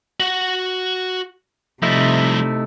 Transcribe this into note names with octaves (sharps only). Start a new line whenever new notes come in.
F#4 F#5
C3 F3 G3 A3 D#4 E4